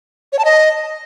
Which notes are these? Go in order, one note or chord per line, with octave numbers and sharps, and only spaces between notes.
C#5
A5
D#5